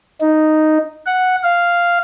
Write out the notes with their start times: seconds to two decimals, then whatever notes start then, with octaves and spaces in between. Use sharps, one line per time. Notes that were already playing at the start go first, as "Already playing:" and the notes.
0.21 D#4
1.06 F#5
1.43 F5